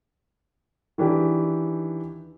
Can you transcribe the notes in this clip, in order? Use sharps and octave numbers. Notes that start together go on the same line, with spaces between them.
D#3 E3 D4 G4 G#4